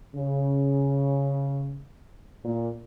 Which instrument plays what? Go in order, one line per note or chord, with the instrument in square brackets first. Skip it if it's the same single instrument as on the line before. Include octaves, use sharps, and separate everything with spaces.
[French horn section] C#3
A#2